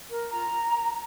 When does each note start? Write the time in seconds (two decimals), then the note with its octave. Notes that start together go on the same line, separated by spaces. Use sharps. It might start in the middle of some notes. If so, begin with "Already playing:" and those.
0.10 A#4
0.31 F4 A#5